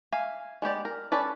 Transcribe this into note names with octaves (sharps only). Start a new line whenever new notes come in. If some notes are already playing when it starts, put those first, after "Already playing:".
E5 F5 G#5
G#3 B3 G4 D5
A#4
C#4 A4 B4 D5